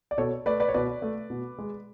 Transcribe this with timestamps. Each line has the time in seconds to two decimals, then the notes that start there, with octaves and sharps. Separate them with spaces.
0.11 D5
0.18 B2 A4 C#5
0.46 A3 B4 D5
0.60 B4 D5
0.68 C#5
0.74 B2 B4 D5
1.02 A3
1.30 B2
1.58 G#3